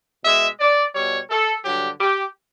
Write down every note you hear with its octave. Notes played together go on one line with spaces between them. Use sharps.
B2 G#3 E5
D5
B2 G3 C#5
A4
G2 D3 F#3 G4
G4